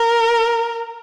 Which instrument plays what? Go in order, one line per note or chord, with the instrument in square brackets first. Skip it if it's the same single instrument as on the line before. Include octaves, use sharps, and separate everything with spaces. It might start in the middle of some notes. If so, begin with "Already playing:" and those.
Already playing: [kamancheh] A#4